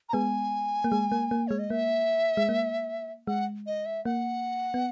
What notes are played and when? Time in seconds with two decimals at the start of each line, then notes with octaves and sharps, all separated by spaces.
0.09 A#5
0.13 G#3 B3 G#5
0.84 A#3
0.92 G#3
1.12 A#3
1.31 A#3
1.47 G#3 C#5
1.59 D#5
1.70 A#3 E5
2.37 G#3
2.49 A#3
3.27 G#3 F#5
3.67 D#5
3.86 E5
4.05 A#3 F#5
4.74 B3